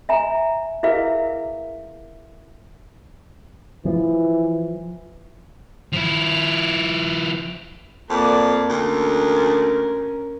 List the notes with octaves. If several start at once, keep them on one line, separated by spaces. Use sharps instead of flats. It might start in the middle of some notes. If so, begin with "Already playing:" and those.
E5 G#5 A#5
E4 G#4 A#4 B4 E5 F5
E3 F3
F3 E4
F2 A#3 D5
D2 C#4 A#4